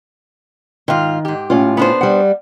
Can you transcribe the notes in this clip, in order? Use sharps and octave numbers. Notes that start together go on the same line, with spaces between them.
G#2 D#3 F4
G#2 G4
A2 C#4 F4
B3 D4 C5
G3 F#5